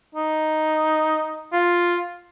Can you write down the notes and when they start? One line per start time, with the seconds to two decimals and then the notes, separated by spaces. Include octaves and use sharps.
0.15 D#4
1.53 F4